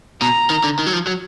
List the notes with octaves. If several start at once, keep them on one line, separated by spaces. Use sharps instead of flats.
B2 A#5
D#3
D3
D#3
F#3
F3
F#3